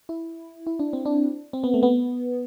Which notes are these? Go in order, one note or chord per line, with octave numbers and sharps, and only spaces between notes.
E4
E4
D4
C4
D4
C4
B3
A3
B3